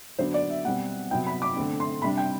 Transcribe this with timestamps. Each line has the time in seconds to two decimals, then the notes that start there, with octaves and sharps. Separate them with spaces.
0.19 D3 F#3 B3 D4 C5
0.34 D5
0.50 E5
0.64 B2 G3 C4 F#5
1.11 C3 F#3 B3 G5
1.26 B5
1.42 D6
1.56 D3 A3 C4
1.80 C6
2.02 C3 G3 D4 B5
2.18 G5